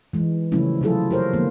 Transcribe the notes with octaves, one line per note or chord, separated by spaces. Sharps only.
E3 G#3
C#3 F3 G3 A3 C#4 E4
C3 F#3 E4 F4 G#4 A4
G4 A#4 C5 C#5
D3 F3 G#3 A#3 B3